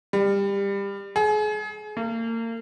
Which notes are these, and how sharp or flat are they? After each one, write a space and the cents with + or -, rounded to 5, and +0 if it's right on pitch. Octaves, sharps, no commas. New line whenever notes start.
G3 +25
G#4 +35
A#3 -35